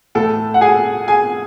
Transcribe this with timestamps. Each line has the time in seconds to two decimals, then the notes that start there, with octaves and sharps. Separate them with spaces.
0.15 A2 E3 A3 A4 A5
0.54 F#5
0.61 G#4 G#5
1.08 G#4 G#5